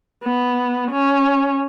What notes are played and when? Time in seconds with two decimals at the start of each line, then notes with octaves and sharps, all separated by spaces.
0.24 B3
0.91 C#4